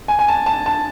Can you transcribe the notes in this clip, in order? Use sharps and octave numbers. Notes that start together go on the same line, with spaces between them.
G#5
G#5
A5
A5
A5